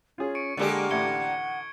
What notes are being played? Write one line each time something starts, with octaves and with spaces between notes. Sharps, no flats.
C#4 F4 G#4
C#6 C#7 D7
D3 G#3 A#3 G4 A4 D5
A1 D2 F#5 G#6 C#7 G7